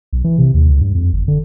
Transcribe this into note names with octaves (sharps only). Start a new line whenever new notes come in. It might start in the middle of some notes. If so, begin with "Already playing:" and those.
B1
E3
C3
D#2
C#2
G2
F2
G1
D3